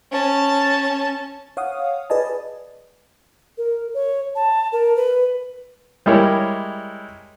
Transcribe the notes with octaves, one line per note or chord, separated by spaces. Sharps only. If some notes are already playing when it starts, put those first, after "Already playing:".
C#4 A5
C#5 F5 F#5 D#6
G#4 B4 D5 D#5 G#5 A5
A#4
C#5
A5
A#4
B4
G3 G#3 E4 A#4 C#5